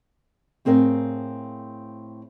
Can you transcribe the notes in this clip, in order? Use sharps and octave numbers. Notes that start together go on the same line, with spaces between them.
A2 C4 G#4 A#4 F5